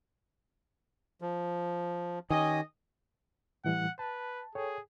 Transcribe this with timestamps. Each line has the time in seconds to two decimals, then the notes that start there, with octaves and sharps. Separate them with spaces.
1.21 F3
2.30 D#3 C#4 G4 D#5 G#5
3.64 A2 E3 G3 F#5
3.99 B4 A5
4.55 G#4 A4 C#5 G5